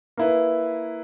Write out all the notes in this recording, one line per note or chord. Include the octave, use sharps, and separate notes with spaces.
A#3 E4 B4